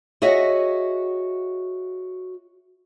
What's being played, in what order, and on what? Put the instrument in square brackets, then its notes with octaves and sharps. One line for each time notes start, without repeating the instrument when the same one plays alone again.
[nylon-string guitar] F#4 G#4 C#5 D#5 E5 F#5